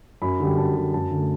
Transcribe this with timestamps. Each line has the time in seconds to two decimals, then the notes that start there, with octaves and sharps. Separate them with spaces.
0.22 F#2 B5
0.40 D3 G3
0.58 F#2 A5
0.76 D3 G3
0.94 F#2 A5
1.11 D3 A3